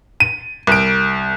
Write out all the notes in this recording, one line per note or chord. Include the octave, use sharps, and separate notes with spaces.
D#7
C2 D7